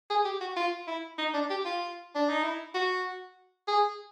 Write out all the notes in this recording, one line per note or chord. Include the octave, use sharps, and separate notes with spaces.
G#4
G4
F#4
F4
E4
D#4
D4
G4
F4
D4
D#4
E4
F#4
G#4